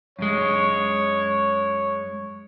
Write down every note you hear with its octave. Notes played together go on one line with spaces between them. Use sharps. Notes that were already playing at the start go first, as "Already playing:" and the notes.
F#2 G#3 C#5